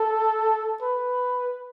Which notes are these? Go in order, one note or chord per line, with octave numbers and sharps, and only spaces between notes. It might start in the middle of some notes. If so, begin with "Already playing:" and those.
Already playing: A4
B4